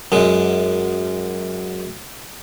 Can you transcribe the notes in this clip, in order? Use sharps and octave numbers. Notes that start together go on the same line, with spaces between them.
F#2 G#3